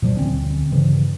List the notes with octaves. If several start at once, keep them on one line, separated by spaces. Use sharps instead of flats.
A#2 F3 G3
D2 D3 C4 C#4
G2 C#3 E3 F3